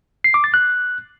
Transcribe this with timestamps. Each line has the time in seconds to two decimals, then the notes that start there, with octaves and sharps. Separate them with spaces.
0.24 C7
0.34 D6
0.44 A6
0.54 F#6